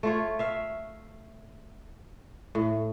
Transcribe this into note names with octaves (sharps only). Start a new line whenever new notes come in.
A3 F4 C#5
E5 F5
A2